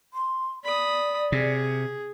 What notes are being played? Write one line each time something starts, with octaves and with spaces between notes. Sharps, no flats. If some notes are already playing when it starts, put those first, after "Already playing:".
C6
D5 B5 D#6
C3 G#4